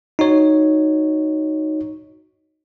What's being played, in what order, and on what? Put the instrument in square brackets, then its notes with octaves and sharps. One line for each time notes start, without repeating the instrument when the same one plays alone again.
[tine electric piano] D#4 F#4 C#5